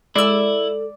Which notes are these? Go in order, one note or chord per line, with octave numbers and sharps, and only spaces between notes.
G#3 E4 A4 D5 E6